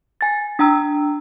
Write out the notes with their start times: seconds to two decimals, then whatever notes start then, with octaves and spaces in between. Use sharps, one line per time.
0.21 G#5 A6
0.59 D4 G5 A#5 E6